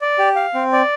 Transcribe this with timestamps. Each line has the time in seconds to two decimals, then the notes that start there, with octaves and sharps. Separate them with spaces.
0.01 D5
0.18 G4
0.36 F5
0.54 C4
0.73 D5